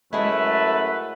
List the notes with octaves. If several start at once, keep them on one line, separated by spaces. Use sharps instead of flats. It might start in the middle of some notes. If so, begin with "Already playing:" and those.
F#2 G#3 A3 E4 B4